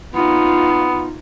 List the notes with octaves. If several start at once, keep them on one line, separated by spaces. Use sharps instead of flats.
B3 D#4 F4